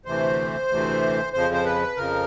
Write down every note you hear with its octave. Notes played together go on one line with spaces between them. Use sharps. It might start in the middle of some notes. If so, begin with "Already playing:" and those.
D2 C3 E3 A3 C5
D2 C3 E3 A3
F2 C#3 F3 C5
C5
B4
F2 C#3 F3 A#4